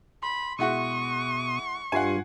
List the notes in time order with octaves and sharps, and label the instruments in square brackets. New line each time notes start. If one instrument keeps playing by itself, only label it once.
[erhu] B5 [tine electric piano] C6
[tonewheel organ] B2 D#6 [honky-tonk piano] G#3 E4 F#4 [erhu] C#6
[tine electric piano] G2 F4 C7 [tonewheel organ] G3 [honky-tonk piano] F#5 G#5